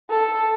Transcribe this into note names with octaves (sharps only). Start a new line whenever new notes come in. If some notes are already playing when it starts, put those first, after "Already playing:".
A4